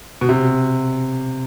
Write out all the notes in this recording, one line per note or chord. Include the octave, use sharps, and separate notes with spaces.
B2
C3